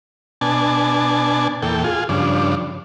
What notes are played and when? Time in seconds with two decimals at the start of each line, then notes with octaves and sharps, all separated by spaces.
0.41 B2 D4 G#5 A5
1.62 E2 A#2 A4 G5
1.84 F4 G#4
2.09 G2 C#3 F3 D4